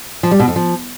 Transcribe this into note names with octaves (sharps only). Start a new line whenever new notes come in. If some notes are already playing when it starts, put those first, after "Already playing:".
F3
G3
B2
F2
F3